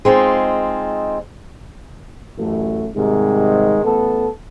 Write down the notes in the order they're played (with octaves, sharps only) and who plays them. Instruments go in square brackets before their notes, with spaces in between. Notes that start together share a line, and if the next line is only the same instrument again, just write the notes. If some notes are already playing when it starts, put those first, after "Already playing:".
[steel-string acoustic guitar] G#3 C4 D#4 F4
[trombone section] A1 F#2 A3
G#2 C3 D#3 G3 G#3
A1 A3 B3 A4